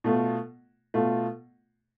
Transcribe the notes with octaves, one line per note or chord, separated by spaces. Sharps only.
B2 A3 F4
B2 A3 F4